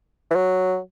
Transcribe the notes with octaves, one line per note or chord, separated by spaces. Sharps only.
E3
F#3